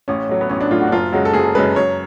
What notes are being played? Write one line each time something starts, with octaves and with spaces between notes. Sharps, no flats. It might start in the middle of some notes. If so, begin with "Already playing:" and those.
A1 C#4
A2 F#3
B3
A1 C#4
D4
A2 F#3 F4
F#4
D4
F#1 F4
F#2 C#3 G#3 F#4
A4
F#1 G#4
F#2 C#3 G#3 B4
F#2 C#5